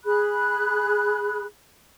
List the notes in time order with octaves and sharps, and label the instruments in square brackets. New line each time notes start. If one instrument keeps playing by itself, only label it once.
[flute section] G#4 B5 F#6